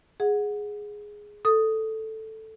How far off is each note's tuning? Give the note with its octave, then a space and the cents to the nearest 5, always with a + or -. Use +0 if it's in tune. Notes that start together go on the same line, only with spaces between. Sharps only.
G#4 +0 F#5 -15
A4 +0 D#6 +0